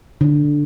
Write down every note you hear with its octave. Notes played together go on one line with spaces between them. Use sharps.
D3